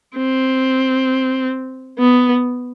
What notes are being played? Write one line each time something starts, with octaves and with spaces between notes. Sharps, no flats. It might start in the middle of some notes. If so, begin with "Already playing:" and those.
C4
B3